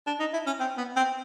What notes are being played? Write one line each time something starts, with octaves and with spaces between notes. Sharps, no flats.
D4
D#4
E4
C#4
C4
B3
C4